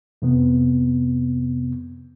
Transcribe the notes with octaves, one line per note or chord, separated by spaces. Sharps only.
F2 C3 B3